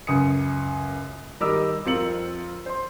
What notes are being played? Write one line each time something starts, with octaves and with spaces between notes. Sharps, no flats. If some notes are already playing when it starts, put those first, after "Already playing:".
C#2 F#2 D#6 C#7
D#3 G3 A#4 D#5 D6 E6
F2 C4 F4 A#4 C#7 F#7
C5 C6